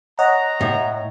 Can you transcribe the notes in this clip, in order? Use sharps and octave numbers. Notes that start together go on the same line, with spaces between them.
C#5 D#5 F#5 A#5
A2